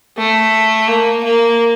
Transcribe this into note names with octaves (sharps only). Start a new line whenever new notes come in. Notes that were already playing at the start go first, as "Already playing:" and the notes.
A3
A#3
A#3